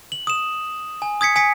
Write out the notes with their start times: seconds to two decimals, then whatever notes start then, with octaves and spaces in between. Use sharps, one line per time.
0.12 F#7
0.27 D#6 E7
1.02 G#5
1.21 D#6 G#6 B6 C#7
1.36 G#5 D#6 B6 C#7